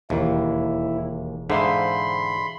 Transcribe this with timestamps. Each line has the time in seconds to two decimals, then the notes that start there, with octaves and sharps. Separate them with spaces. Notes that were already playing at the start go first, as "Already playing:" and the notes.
0.10 E1 D#2 E4
1.50 G#2 D3 C5 E5 F5 B5 C6